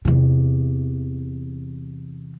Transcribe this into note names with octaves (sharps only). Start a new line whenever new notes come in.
E2 C3